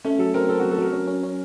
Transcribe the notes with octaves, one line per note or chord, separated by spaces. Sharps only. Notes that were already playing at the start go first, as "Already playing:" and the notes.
A3 C#4
F#3 A4
C4 A#4
C4 A4
F#4
F#3
A4
F#3 A#4
C#4
C#4
C#4